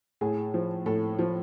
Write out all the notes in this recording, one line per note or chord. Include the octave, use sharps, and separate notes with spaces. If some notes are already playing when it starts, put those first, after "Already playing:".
A2 G#4
F3
A2 A4
F3